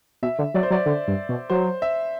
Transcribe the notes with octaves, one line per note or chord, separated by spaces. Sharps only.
B2 E5
D3
F#3 D5
C5
F#3 D5
D3
G2
B2
F#3 C5
E5